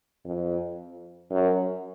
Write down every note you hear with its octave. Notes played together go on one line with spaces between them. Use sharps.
F2
F#2